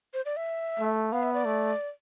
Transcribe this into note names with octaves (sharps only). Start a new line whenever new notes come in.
C5
D5
E5
A3
B3 F5
E5
D5
A3